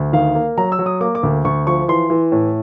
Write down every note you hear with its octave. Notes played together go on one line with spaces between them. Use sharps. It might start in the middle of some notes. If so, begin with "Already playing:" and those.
Already playing: D2
D#3 F5
A#3
F#3 A#5
E6
F#3
D#6
A#3 D6
D6
D2
D2 C#6
F3 C#6
E3 C6
E3
A2